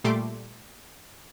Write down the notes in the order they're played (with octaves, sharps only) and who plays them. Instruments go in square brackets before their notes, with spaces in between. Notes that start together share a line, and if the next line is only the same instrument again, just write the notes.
[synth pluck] A#2 G3 A3 C6 D6